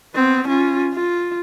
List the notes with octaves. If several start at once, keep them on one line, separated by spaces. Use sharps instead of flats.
B3 C4
C#4 F4
F4